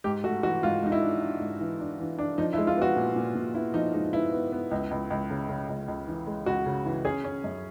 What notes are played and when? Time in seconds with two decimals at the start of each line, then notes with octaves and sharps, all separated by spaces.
0.04 G#2 G4
0.24 A3 F#4
0.43 E3 F#4
0.63 G#2 F4
0.82 G#2 D#4
0.92 E4
1.02 D4
1.21 D4
1.41 G#2
1.60 E3
1.80 D4
1.99 E3
2.19 D4
2.38 F3 D#4
2.53 E4
2.58 G#3
2.67 F4
2.77 B3 F#4
2.96 A#2
3.16 A#2
3.35 A#2
3.54 B3 E4
3.74 F3 D#4
3.93 G#3 D#4
4.13 B3 E4
4.32 B3
4.52 B3
4.71 C#2
4.91 C#2
5.10 C#2
5.30 C#3
5.49 C#3
5.69 C#2
5.88 C#2
6.08 E3
6.27 G#3
6.46 C#2 F#4
6.66 C#3
6.86 E3
7.05 C#4 G#4
7.24 C#4
7.44 F#2